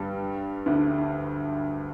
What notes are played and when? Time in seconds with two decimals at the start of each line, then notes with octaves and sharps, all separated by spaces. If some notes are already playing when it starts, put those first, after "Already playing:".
Already playing: G2 G3
0.66 D2 D3